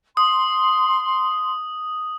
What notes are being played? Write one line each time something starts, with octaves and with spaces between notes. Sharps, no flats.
C6 D#6